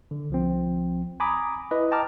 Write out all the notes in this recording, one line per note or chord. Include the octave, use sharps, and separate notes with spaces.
D3
C2 F3 C4
G#5 A#5 B5 D6 D#6
E4 B4 D#5
D#5 G5 A5 A#5 D6 F6